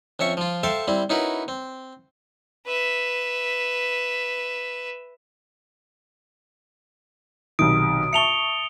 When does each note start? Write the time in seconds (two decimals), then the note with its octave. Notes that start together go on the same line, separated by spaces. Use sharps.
0.19 F2 C#4 E5 C#6
0.37 F3 F4
0.63 A4 C5 E5 F5 G5 A5
0.88 G3 C4 E4
1.10 C#4 D#4 E4 F#4 A#4 B4
1.48 C4
2.66 B4 E5
7.59 B1 C3 D#3 D#6 D7
8.13 E5 A5 C#6 C#7 F7 G7